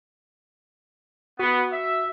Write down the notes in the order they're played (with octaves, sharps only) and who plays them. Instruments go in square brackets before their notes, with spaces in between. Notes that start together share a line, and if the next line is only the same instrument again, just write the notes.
[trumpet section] B3 [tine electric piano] F#4
[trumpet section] E5